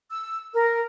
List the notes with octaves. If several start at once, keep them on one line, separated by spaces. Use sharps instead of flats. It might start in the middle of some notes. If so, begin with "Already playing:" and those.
E6
A#4